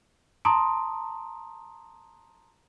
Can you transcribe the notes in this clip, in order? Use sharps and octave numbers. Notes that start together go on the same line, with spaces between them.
A5 A#5 C6 D6 D#6